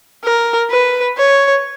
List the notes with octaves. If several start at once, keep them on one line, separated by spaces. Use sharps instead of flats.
A#4
B4
C#5